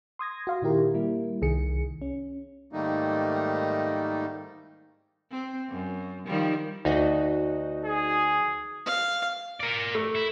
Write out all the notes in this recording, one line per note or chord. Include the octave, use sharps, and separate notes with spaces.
C6 D#6 G#6 A#6
F#4 F5 C6
A#2 D#3 E4 G4 A#4
G3 A#3 E4
C2 D#3 G#4 C#7
C#4
G#2 D#3 G3 A3 A#3 D#4
C4
F#2
D#3 F3 G3
D2 D#4 F#4 D#5
G#4
F5
A#4 D5
A3
E4